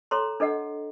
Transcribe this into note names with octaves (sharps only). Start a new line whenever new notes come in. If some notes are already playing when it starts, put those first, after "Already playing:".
A4 C#5 A#5 C6
D4 A4 D#5 F#5